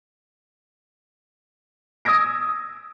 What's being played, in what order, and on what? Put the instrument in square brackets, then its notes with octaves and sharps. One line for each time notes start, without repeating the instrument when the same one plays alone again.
[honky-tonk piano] D#6 E6 G#6 A#6 D7